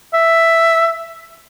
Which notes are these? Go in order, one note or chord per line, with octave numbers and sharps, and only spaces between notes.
E5